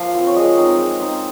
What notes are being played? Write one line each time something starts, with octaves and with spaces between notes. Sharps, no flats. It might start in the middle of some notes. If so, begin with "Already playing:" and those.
Already playing: F3 A#3 F5
C4 F4
C#5
G#3 D#5
C4 D#4
G#3
C4 D#4